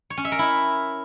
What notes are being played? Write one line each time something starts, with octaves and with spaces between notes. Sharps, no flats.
C#5
C#4
E5
A#4
E4